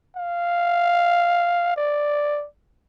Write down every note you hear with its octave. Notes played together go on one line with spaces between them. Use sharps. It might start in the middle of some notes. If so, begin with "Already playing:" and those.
F5
D5